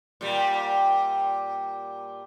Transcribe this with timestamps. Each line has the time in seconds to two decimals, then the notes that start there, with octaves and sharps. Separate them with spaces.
0.21 A#2 G3